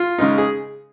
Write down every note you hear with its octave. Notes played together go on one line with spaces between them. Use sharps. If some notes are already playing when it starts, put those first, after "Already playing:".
Already playing: F4
C#3 G#3 D#4
G#4